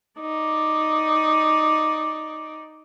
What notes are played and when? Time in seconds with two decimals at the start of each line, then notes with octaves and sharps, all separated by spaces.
0.20 D#4 D5